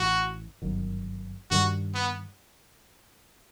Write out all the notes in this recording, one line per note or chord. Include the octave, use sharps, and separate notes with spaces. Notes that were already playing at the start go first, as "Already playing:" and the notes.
Already playing: A1 A2 E3 F#4
G1 F#2 D#3
G2 D#3 G3 F#4
B3